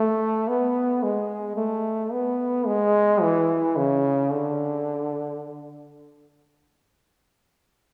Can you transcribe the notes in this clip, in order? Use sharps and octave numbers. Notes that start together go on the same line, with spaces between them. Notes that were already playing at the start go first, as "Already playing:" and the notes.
Already playing: A3
B3
G#3
A3
B3
G#3
E3
C#3
D3